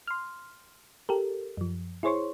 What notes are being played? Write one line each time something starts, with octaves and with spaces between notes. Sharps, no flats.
C6 F6
G4 A4 A#4
F#2 F3
E4 G#4 C5 C#5 C6 C#6